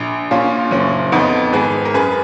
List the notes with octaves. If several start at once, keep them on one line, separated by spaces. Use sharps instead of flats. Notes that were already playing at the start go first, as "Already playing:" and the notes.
Already playing: A#1
A#2 C#4 F4
F#1 C#4
F2 B3 D#4
G#1 G#4 B4
A#4
F#2 G#4 B4